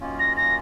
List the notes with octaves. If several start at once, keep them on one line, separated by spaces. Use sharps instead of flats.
F#2 D#3 A#3 C#4 F4
A#6
A#6